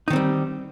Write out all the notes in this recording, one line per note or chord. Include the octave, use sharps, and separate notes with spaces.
D#3 G3 C4 D#4